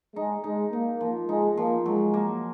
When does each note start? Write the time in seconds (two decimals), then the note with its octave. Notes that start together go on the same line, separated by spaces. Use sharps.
0.15 G#3 D#4
0.44 G#3 D#4
0.73 A#3 D#4
1.01 F3
1.29 G#3 D#4
1.57 F3 A#3
1.86 F#3 G#3
2.14 A#3